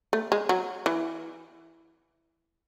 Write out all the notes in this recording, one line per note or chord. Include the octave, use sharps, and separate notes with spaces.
A3
G#3
F#3
E3